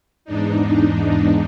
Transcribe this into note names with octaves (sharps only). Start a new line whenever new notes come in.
E2 G#2 D4 D#4